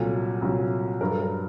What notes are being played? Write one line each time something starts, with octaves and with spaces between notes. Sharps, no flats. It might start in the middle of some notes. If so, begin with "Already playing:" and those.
Already playing: C2 A#2 F#3 A4
C2 A#2 F#3
G2 F#3 A#4
A4
A#4